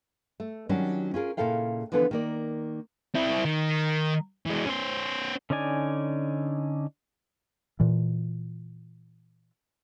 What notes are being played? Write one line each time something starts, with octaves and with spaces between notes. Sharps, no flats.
A3
D#3 F#3 G3 C#4 D4 F#4
C#4 F4 G#4 A#4
A#2 C#3 E4 A4 F5 G5
D3 E3 F3 B3 A4 B4
D#3 A#3 D5
C4 E4
D#3
E3 G#3
C#4 C5
D3 C#4 D#4 D5 G#5
A#2 E3